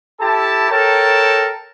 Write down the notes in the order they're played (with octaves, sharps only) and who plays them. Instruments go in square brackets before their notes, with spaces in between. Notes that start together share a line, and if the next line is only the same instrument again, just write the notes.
[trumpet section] E4 G4 A4 A5
A4 A#4 C#5 G5 A5